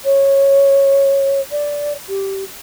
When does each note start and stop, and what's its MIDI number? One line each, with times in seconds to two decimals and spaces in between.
0.05 1.40 73
1.52 1.93 74
2.09 2.44 67